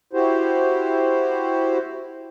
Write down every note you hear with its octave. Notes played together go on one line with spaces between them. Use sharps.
E4 F#4 G4 C5